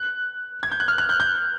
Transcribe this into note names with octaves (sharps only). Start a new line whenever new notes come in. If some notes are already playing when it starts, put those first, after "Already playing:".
Already playing: F#6
G#6
G6
F#6
F6
F#6
G6
G6